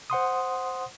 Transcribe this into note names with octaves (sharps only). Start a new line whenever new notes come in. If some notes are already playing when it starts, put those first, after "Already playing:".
C5 F#5 C6 D#6